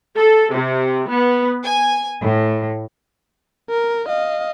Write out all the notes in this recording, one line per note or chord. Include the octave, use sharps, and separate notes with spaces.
A4
C3
B3
G#5
A2
A#4
D#5 F5